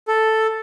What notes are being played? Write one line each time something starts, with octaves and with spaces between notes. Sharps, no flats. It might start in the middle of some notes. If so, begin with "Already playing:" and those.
A4